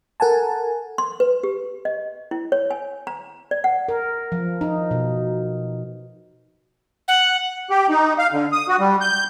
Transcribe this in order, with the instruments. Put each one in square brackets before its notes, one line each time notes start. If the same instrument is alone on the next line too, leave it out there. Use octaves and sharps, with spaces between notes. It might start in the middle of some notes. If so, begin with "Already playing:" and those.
[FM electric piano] A4 A#4 F#5 G#5 A5
[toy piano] C6
B4
G4
D#5
E4
C#5
G#5
A#5
D5
F#5
[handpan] A#4
F3
D#4
B2
[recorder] F#5
[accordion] G4
D#4
F5
D3
D#6
F#4
G3
G6